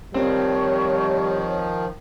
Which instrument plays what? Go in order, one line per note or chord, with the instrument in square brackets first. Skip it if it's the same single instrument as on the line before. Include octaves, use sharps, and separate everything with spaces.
[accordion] D#3 F3 [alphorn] G3 [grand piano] C4 [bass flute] C#5